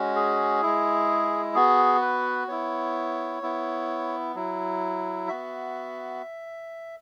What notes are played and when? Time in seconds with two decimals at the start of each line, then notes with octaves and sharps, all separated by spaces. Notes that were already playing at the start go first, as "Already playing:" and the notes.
Already playing: G#3 C#4 F#4
0.16 G#4
0.62 G#3 E4
1.55 B3 F#4 G#4
2.01 B4
2.48 B3 E4 C#5
3.42 B3 E4
4.35 F#3 E4
5.28 B3 F#4 E5